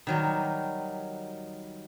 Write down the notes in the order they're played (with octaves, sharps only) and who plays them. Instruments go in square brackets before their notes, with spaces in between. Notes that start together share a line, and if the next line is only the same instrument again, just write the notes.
[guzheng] D#3 F#3 G3